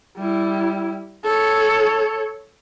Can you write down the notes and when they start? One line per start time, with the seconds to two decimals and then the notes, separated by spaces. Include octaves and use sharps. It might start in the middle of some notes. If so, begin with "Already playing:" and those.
0.17 G3 E4
1.25 A4 C#5